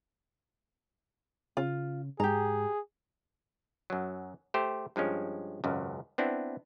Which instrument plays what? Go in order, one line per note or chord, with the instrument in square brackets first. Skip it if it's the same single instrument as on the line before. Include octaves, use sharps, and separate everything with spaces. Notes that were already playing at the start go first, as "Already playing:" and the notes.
[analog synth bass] C#3 [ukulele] F4
[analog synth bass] G#2 [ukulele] G4 A#5 [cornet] G#4
[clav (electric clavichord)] F#2 F#3
A3 G4 C5
G2 F3 G#3 C#4
G#1 C#2 F#2
B3 C4 D4 E4